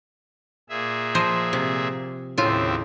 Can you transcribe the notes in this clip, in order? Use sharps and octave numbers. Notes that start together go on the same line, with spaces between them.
A#2 G#4 E5
F3 C5 D#5
C3
D#2 A2 C#3 C4 F4 E5